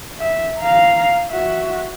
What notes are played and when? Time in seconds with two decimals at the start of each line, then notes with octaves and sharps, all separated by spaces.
0.19 E5
0.58 F5 A#5
1.28 F#4 E5